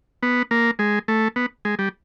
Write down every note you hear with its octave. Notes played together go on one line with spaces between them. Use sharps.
B3
A#3
G#3
A3
B3
G#3
G3